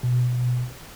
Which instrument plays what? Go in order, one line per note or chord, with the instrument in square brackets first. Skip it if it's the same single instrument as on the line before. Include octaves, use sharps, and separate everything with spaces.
[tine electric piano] B2